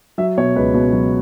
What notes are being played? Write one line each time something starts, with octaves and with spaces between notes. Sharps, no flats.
F#3 E5
B2 C#5
C#2 B4
B2
F#3